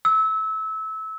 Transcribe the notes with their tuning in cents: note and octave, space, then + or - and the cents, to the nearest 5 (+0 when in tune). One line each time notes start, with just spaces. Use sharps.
E6 -25